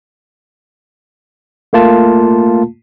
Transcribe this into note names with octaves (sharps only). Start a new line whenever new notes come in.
A3 A#3 F4 A5